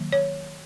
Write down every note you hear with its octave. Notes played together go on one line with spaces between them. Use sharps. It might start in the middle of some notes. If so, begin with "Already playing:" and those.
Already playing: D#3 F#3 A#3
C#5